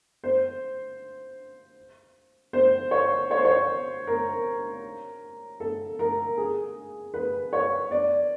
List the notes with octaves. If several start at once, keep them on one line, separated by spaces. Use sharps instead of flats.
C5
C5
C#5
C#5
C5
C#5
A#4
A4
A#4
G#4
B4
C#5
D5